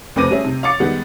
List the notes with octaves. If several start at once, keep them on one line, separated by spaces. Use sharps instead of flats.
F1 C4 B4 D6 A#6 D#7
G3 C#4 G#4 E5
C3
F5 C#6 D6 A6 C#7
D#3 G3 G#3 B3